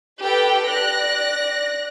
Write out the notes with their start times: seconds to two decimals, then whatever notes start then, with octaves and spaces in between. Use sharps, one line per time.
0.22 G4 A4 B4 G5
0.66 D5 F#6 A#6